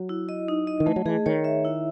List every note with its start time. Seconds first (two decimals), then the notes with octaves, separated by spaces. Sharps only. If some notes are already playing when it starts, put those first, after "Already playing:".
Already playing: F#3
0.09 E4
0.29 D#5
0.48 D#4
0.67 D#5
0.80 D#3
0.86 E3 A3
0.96 F#3
1.05 E3 G#4
1.26 D#3 C#5
1.44 E5
1.65 E4